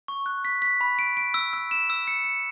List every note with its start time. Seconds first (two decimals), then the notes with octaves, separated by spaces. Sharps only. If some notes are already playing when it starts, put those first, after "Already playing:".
0.08 C#6
0.26 F#6
0.45 B6
0.62 B6
0.81 B5
0.99 D7
1.17 D7
1.34 E6
1.53 E6
1.71 E7
1.90 E6
2.08 C#7
2.25 C#7